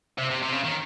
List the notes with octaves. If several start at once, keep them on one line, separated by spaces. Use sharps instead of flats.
C3
C3
C3
C#3
D#3